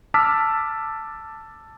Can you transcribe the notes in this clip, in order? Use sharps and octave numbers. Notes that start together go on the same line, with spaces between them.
A5 D6 E6 F6 B6